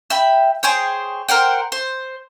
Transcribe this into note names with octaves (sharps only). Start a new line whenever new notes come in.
E5 G5 B5
G#4 C5 C#5 G5
A#4 C5 F#5 G5
C5